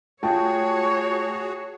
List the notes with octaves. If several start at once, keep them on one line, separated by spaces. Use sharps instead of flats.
A3 F4 F#4 G#4 C#5 G5 A5